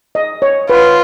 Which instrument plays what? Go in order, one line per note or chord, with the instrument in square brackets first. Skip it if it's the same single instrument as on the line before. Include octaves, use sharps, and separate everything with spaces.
[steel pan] D#5
C#5
[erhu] F4 [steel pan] B4